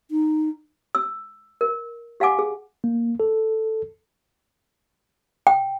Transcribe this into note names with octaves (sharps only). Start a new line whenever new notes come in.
D#4
E6
A#4
G4 F5 F#5 G#5 D6
G#4
A#3
A4
G5